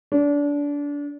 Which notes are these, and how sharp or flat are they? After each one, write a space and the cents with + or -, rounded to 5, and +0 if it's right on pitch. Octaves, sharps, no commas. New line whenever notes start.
D4 -25